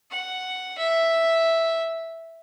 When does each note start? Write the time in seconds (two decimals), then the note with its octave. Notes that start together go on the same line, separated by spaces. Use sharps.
0.10 F#5
0.78 E5